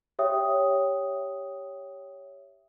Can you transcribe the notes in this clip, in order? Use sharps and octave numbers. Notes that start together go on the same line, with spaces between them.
G4 C#5 E5 G5 D#6